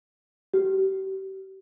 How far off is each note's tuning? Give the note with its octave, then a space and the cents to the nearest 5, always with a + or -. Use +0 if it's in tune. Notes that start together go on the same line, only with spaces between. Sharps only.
G4 -35